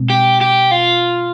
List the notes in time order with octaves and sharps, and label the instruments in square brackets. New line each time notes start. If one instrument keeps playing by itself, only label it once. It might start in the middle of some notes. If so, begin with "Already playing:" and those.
Already playing: [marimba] B2 G#3 C4
[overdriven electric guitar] G4
G4
F4